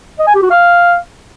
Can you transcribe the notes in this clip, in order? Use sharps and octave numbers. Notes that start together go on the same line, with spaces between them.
D#5
G#5
G4
F#4
F5